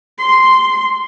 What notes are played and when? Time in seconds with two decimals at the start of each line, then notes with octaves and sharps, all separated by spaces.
0.18 C6